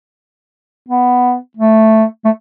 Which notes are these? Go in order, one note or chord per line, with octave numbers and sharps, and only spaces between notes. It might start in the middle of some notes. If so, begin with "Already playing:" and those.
B3
A3
A3